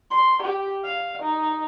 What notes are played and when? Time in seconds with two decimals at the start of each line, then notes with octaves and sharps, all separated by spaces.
0.11 C6
0.42 G4
0.84 F5
1.22 D#4